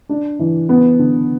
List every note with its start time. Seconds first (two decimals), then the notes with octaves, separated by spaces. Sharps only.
0.09 D4
0.39 E3
0.69 B3
0.99 D3